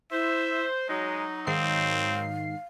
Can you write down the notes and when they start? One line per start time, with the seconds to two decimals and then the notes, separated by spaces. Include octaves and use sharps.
0.12 E4 C5 E5
0.89 F#3 G#3 D#4 A#5
1.47 G#2 D#3 C4 F5 C7